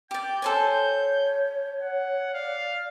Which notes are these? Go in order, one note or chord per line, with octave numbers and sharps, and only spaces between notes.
G4 D5 G5 G6
A4 C5 C#5 G#5
F#5
D5 F5